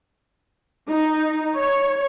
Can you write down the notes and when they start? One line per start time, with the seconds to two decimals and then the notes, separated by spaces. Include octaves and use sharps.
0.88 D#4
1.56 C#5